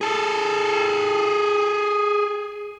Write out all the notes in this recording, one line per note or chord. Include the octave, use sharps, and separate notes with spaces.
G#4 A4